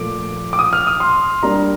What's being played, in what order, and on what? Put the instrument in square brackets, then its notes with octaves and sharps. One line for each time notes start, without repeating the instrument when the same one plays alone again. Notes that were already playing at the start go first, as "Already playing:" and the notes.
Already playing: [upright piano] A#2 F3 A3 [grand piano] D6
[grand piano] D6
D#6
F6
D#6
C6
[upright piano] G3 A#3 D4 [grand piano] A#5